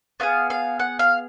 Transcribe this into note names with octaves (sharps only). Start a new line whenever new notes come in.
B3 D#4 G#4 F5
F5
F#5
F5